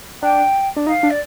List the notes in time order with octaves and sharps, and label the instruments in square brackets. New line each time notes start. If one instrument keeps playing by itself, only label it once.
[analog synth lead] D4 [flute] G5
[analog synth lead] D4
[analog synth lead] D#4 [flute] F5
[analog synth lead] D4
[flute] D5